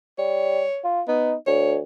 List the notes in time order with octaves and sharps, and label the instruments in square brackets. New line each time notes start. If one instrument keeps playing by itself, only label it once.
[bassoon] G3 [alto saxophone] C#5
[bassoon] F4
[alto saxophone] B3 [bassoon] D#4
[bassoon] D2 [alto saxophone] C#5